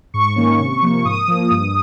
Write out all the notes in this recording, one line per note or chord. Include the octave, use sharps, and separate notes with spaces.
G#2 C#6
D#3 A#3 C#4
C3
F3 A#3
G#2 D#6
F3 A#3
G2